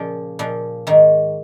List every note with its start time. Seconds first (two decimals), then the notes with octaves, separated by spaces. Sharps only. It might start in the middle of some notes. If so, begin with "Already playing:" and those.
Already playing: A#2 C#3 F3
0.39 A#2 F3
0.87 G#2 D#3